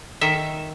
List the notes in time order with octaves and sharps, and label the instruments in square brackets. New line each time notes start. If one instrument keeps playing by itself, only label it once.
[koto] D#3 E5